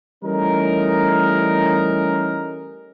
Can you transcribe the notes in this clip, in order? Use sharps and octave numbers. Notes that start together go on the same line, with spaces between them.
E3 G3 A3 C#4 D#4 A#4